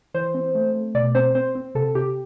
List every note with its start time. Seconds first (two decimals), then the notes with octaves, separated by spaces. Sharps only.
0.14 E3 C5
0.35 C4
0.55 A3
0.75 A3
0.95 B2 D5
1.15 C4 C5
1.35 C4 C5
1.55 C4
1.75 C3 A4
1.95 C3 G4